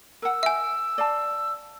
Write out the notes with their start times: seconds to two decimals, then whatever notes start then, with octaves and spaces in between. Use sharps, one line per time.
0.22 A#4 F#5 E6
0.43 E5 G#5
0.98 D5 F5 A5